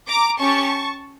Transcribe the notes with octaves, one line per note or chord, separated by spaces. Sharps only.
A#5 D6
C#4 G4 A5 C#6